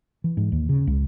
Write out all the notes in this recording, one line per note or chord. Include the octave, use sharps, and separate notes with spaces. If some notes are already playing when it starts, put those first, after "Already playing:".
E3
G#2
D#2
C#3
C#2